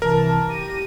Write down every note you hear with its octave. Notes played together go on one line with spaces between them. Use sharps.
C2 E3 A#4 A5
G4 A#6 D#7